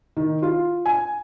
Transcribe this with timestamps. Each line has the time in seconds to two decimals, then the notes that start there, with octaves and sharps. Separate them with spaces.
0.17 D#3
0.42 F4
0.86 G#5